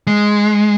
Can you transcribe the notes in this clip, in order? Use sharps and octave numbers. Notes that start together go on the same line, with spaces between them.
G#3